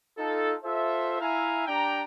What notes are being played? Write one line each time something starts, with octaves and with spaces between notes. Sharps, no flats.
D#4 F4 A4
F4 A4 C5 E5
E4 E5 F5 G#5 A#5
D4 G4 G5 A#5